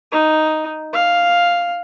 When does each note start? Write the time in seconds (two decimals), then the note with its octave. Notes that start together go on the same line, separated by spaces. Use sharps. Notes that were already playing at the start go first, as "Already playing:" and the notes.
0.12 D#4
0.93 F5